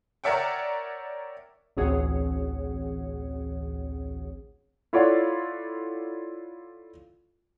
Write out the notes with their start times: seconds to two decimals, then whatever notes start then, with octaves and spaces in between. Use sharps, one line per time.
0.24 A#4 C#5 D5 E5 F#5 G5
1.77 A1 D2 C4 G#4 C#5 F#5
4.93 E4 F4 A4 C#5 D5 F#5